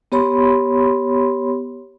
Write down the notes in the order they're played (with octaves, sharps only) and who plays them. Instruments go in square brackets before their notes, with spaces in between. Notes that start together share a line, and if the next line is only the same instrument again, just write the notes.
[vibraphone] B3 G4 C#5 B5 C6